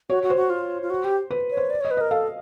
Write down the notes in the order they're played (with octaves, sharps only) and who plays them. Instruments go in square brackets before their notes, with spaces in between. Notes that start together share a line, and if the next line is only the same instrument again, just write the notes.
[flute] F#4 [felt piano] C#5
[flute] F#4
[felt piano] C5
[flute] F#4
F4
F4
F#4
G4
[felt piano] B4
[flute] C#5
[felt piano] C5
[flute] D5
[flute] C#5 [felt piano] D#5
[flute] B4
[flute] A#4 [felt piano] D#5
[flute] A4 [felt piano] F5